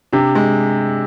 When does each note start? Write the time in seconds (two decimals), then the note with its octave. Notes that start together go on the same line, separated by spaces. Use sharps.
0.12 C3 D4
0.35 G#3